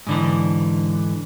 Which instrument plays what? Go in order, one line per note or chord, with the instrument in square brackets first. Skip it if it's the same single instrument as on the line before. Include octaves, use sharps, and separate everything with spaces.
[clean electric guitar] G#2 D3 E3